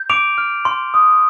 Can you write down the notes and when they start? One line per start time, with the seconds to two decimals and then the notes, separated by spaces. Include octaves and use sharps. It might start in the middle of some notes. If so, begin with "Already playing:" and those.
Already playing: G6
0.10 D6 D7 F7
0.38 F6
0.65 C6
0.94 D#6